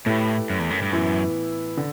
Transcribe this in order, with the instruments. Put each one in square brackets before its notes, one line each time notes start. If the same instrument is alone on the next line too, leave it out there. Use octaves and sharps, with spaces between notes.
[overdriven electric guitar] A2 [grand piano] A3 E4 G4 B4
[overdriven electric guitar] F#2
E2
F#2
G2
[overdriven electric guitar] F#2 [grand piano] A2 E3 B3 E4
[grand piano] D3